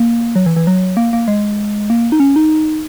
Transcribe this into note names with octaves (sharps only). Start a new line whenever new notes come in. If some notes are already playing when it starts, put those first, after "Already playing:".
Already playing: A#3
F#3
E3
E3
F#3
A#3
A#3
G#3
A#3
D#4
C#4
D#4